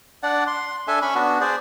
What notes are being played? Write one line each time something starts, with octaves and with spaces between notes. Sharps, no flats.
D4 D5 F#5
C6
D4 A4 E5 G#5
C#4 B5 C#6
B3 D4 F#4
G#4 C5 D5